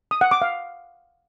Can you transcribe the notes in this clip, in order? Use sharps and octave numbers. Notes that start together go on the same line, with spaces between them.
D#6
F#5
D6
F5